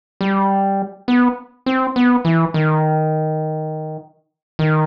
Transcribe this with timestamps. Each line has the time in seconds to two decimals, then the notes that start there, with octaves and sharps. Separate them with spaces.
0.21 G3
1.08 B3
1.66 C4
1.96 B3
2.25 E3
2.54 D#3
4.59 D#3